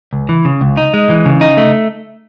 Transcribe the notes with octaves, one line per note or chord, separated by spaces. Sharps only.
C#2
E3
C#3
C#2
D#4
G#3
E3
C#3
D#4
A3